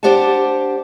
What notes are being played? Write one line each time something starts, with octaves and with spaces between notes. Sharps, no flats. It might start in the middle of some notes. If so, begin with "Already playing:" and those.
D4 G4 C5 D5 F#5 A5